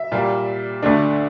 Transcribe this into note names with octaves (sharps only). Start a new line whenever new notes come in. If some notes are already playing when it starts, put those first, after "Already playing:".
Already playing: E5
A#2 G3 A#3
D2 D3 A3 D4